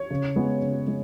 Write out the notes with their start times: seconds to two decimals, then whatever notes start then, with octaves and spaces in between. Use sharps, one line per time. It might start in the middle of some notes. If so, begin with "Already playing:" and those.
Already playing: C#5
0.11 C#3
0.36 G#3 B3
0.62 C#3
0.87 G#3